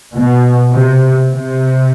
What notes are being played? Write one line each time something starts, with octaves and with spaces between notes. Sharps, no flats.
B2
C3
C3